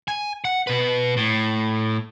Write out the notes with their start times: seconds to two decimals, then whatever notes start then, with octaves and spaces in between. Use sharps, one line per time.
0.08 G#5
0.45 F#5
0.67 B2 B4
1.17 A2